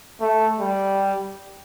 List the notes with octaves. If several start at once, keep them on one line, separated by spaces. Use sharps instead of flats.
A3
G3